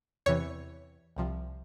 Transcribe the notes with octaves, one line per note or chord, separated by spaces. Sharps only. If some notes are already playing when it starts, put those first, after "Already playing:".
E2 C3 E3 C#5
C2 C3 F3